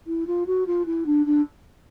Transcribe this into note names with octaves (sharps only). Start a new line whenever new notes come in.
E4
F4
F#4
F4
E4
D4
D4